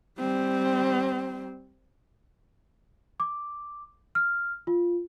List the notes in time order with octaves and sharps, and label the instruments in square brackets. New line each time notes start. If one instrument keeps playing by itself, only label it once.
[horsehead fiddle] G3 C4
[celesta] D6
F6
F4